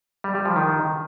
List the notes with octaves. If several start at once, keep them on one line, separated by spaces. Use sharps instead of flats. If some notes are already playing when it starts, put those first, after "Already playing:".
G3
G3
F3
D#3